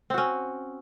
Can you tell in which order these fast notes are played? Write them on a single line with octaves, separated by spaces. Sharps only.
C4 F#4 C#4